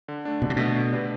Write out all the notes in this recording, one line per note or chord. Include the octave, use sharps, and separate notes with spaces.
D3
A3 D4
B2 D3
C3
B2 A3 D4
D3
A3 D4 G4 B4